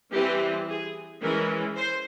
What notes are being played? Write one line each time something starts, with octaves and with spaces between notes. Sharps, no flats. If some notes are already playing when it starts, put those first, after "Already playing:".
E3 G3 C4 G4
G#4
E3 G#3 C#4 A#4
C5